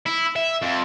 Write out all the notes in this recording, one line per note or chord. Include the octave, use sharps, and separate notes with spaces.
E4
E5
F2